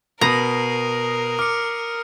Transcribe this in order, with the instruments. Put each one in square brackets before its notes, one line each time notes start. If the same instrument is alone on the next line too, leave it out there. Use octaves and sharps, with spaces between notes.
[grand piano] B2 B5 [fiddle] A#4 [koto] A#5 [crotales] D#6 C7 D#7
[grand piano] D6 [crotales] F6 C#7